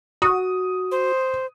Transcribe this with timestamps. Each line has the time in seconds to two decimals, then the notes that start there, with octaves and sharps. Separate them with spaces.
0.22 F#4 D#6
0.91 C5